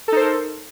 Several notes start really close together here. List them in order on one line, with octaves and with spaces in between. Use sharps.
A4 D#4 C5 A#4